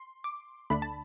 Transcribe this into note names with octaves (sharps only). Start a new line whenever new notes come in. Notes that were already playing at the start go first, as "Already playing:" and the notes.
Already playing: C6
D6
D2 D3 A3 D4 B5
A5